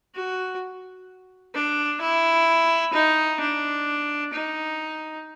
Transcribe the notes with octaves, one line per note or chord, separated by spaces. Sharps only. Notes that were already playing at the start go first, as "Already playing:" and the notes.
F#4
D4
E4
D#4
D4
D#4